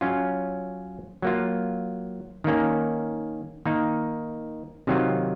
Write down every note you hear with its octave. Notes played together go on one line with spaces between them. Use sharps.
F#3 C#4 F4
F#3 A#3 F4
D#3 A#3 C#4
D#3 A#3 D#4
C3 D#3 F#3 C4 F4